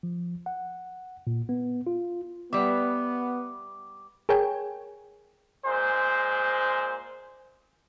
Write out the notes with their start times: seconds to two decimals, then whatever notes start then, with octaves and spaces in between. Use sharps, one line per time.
0.03 F3
0.46 F#5
1.27 A#2
1.49 B3
1.87 F4
2.53 G3 B3 E5 D6
4.29 G#4 A#4 C#5 G5 G#5
5.65 A#2 G#3 C5